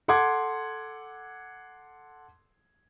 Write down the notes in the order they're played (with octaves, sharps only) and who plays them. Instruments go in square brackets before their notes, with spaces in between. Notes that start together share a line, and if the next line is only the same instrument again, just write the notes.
[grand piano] A4 F#5 C6 D6 G#6